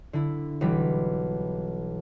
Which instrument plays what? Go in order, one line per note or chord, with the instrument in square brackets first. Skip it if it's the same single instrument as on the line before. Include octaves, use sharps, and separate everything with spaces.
[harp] D3 E4
B1 E3 G3 B6